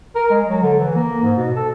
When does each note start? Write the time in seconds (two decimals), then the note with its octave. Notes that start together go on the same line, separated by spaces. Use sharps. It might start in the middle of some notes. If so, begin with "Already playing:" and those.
0.15 A#4
0.30 G#3
0.48 F#3
0.62 D3
0.79 E3
0.95 A#3
1.23 G#2
1.37 B2
1.56 A4